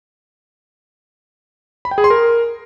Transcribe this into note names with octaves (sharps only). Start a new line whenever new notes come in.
B5
G5
G#4
C6
A#4